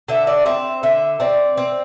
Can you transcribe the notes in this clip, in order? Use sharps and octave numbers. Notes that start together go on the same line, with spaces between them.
D3 E5
D5
C4 E5
D3 E5
C4 D5
C4